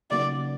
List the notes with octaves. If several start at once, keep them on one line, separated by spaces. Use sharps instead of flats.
C#3 F#3 A#3 D#4 F#4 D5